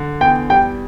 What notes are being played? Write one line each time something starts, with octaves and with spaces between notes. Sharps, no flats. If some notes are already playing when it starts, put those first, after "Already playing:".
Already playing: D3
E2 G5
G3 G5